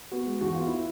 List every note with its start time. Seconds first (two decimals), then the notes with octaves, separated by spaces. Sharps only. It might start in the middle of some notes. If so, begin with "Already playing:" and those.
0.12 B3 F#4
0.26 G#3
0.41 E2 F#4
0.54 B3 F4
0.67 E4